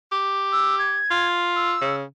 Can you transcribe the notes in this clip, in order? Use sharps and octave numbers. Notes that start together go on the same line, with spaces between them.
G4
E6
G#6
F4
E6
C#3